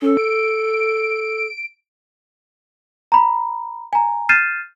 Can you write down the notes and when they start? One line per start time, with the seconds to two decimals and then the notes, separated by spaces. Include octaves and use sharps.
0.02 C#4 A4
0.17 D7
3.12 A#5 B5
3.93 G#5 A#5
4.29 F6 G6 A6 C7 D#7 E7